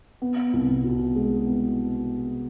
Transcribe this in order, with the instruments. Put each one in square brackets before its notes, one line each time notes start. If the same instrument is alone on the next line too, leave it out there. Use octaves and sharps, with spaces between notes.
[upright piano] B3
C2
B2
G#3
B3